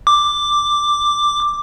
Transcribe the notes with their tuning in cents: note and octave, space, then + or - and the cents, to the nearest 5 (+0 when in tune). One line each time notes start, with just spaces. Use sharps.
D6 +5